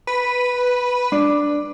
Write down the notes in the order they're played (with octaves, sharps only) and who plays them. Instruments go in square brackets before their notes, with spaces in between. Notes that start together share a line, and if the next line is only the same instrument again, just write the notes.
[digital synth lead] B4
[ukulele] D4